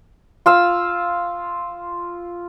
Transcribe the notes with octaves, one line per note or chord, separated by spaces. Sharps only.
F4 F5 E6